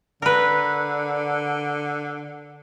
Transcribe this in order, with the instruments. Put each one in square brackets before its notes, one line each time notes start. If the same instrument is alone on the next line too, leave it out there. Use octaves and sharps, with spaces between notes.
[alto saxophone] D3 [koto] A#4 B4